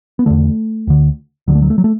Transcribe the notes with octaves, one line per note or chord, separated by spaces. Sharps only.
B3
E2 D3 A3
D2 D3
D2 D3 F#3
A3
F#3
A3
F#3
A3